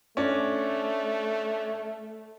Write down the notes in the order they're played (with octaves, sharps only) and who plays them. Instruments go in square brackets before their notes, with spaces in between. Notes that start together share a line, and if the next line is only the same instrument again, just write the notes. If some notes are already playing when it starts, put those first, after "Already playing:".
[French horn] A3 [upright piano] C#4 D4